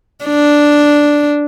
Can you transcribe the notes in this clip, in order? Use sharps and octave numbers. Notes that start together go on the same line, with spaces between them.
D4